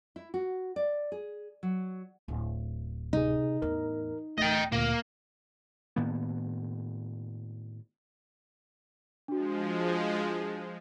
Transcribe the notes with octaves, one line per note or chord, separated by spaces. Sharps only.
E4
F#4
D5
G#4
F#3
D1
C3 D#4 G#4
E2 A2 A#4
D1 A3 D#5 G5 A6
D2 A#2 A#3
A2 D#3 A#3 B3
F3 G#3 D4 F#4